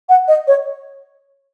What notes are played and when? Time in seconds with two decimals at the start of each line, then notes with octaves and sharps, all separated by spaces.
0.09 F#5
0.28 D#5
0.48 C#5